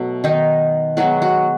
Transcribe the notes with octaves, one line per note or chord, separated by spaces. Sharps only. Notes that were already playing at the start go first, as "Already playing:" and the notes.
Already playing: B2 F#3 A3
D#3 D#4
D#3 F#3 G#3 B3 F#4
F#3 F#4